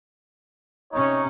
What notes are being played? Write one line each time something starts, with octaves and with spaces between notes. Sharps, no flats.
C3 C#4 D#4 C#5